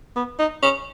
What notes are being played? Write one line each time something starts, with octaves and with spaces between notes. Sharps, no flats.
B3
D#4
C#4